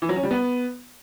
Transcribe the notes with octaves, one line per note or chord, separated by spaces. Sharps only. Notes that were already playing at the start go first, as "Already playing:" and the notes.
E3
F#3
C#4
G3
B3